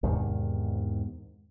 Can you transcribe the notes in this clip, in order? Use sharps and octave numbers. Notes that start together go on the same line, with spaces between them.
E2 G#2 C3 D#3